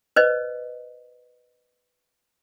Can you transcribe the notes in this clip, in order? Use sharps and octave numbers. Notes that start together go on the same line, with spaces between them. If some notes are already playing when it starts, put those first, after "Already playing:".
B4 C5 D#5